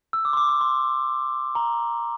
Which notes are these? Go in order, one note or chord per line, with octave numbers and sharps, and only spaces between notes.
E6
D6
C6
D6
D6
C6
A#5